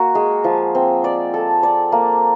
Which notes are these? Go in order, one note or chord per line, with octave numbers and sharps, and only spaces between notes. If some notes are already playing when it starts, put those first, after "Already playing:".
Already playing: A#3 F#4
G#3
F3
C4
D5
A4
D5
A#3